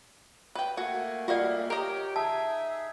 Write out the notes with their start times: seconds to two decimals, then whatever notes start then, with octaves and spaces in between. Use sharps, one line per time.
0.55 B4 G5
0.77 A3 A#3 F#4 F#5 G#5
1.28 G3 A3 F4 F#4 D5 D#5 F5
1.70 G4 A#4 C#5 D#5
2.16 D#4 G#4 E5 G#5 A5